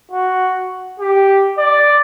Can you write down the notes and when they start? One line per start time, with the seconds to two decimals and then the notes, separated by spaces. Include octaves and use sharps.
0.11 F#4
1.00 G4
1.58 D5